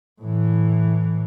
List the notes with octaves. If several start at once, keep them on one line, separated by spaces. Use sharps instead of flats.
A2 E3